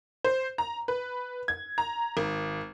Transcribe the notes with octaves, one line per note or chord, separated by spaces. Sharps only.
C5
A#5
B4
G#6
A#5
G#1